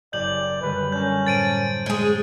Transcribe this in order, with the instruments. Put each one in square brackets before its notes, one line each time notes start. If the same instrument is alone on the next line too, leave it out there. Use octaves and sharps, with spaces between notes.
[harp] F#1 G4 G#5 [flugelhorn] D5 [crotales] G6 F#7
[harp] F#2 D3 G3 [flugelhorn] B4
[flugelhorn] C#4 [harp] D4 A4 A#4 [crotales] G6
[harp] A2 C5 A5 [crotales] A6 D7 D#7
[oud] G#3 G#4